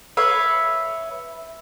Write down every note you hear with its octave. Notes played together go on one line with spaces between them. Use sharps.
B4 C#5 E5 F5